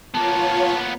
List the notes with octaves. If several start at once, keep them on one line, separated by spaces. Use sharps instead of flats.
A#3 B3 F4 C#5 A5